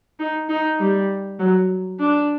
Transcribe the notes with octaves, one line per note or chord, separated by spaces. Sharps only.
D#4
D#4
G3
F#3
D4